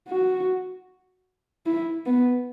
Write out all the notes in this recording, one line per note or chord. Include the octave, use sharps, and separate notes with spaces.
F#4
E4
B3